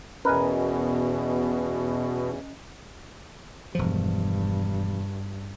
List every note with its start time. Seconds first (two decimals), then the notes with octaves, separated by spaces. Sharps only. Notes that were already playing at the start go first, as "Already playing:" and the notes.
0.25 E2 B2 C#4 A#4 B4 D#5 G#5
3.75 E1 G2 F3